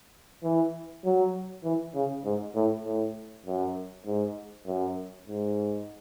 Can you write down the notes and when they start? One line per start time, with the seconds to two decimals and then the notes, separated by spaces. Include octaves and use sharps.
0.43 E3
1.05 F#3
1.64 E3
1.95 C#3
2.25 G#2
2.55 A2
2.85 A2
3.46 F#2
4.06 G#2
4.66 F#2
5.27 G#2